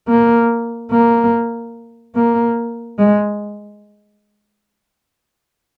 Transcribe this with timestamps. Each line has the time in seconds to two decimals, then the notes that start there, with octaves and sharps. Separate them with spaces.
0.08 A#3
0.91 A#3
2.15 A#3
2.99 G#3